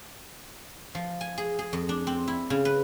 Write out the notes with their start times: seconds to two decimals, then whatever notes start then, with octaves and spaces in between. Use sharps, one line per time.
0.95 F3
1.21 G#5
1.38 G#4
1.59 G#4
1.73 F2
1.89 D4
2.07 C4
2.28 E4
2.50 C#3
2.65 B4